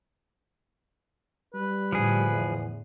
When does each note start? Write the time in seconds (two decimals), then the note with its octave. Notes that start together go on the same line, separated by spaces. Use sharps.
1.54 G3 B4
1.92 A2 D3 F3 G#4
2.32 E2